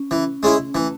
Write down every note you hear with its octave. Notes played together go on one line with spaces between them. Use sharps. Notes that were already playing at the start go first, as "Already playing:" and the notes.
Already playing: C#4
E3
G#3 C#4 E4
E3 A3